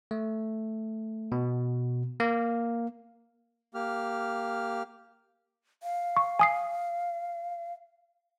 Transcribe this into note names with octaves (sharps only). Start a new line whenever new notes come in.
A3
B2
A#3
A#3 G4 F6
F5
C#6
G#5 D#6 C7